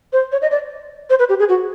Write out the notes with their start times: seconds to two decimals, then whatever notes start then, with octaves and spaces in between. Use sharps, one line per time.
0.13 C5
0.32 C#5
0.42 D#5
0.51 D5
1.10 C5
1.19 B4
1.29 G4
1.39 G#4
1.49 F#4